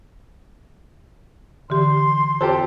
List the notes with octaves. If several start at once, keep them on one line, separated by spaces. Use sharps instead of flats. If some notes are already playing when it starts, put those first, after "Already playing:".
D3 E3 G4 C6
F4 G4 A4 C5 A5 E6